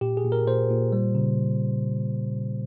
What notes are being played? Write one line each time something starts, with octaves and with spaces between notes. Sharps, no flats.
A#2 G4
G#4
A#2
A#4
A#2 C5
A#2
G3
C#3